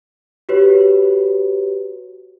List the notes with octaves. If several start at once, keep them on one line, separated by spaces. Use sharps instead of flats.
F#4 G4 B4 C#5